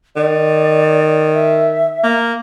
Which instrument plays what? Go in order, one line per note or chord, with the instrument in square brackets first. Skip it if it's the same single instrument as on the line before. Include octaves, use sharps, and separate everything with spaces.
[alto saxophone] D#3 [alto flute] D5
[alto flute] E5
[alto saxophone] A#3